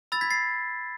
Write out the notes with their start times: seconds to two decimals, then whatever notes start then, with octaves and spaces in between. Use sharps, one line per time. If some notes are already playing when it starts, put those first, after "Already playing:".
0.12 B5 E6 A6
0.21 G#6 B6
0.30 A6 C7